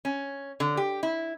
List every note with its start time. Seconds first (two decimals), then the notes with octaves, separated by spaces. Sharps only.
0.05 C#4
0.60 D3
0.77 G4
1.03 E4